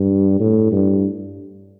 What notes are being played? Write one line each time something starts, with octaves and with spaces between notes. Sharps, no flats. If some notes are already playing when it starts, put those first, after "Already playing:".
Already playing: G2
A2
G2